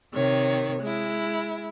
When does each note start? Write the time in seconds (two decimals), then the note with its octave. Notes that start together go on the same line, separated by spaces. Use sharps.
0.14 C3 D#3 C#5
0.82 G#3 E4